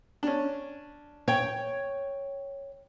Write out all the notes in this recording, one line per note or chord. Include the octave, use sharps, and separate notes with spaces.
C#4 D4
C#5 G5